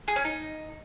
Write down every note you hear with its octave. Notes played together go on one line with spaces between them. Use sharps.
G#4
C#4
D#4